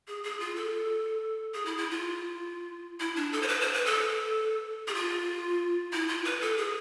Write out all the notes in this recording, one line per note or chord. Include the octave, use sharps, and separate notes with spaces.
G#4
G#4
F4
A4
G#4
E4
E4
F4
E4
D4
A4
C5
B4
C5
B4
A4
G#4
F4
E4
F4
B4
A4
G#4